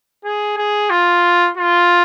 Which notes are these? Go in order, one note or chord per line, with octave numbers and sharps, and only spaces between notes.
G#4
G#4
F4
F4